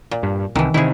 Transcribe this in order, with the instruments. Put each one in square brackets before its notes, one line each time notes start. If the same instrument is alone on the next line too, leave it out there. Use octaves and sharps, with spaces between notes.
[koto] A#2
[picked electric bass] G2
[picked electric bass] C2 [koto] D#3 E3
[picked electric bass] C3 D#3 [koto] E4 G#4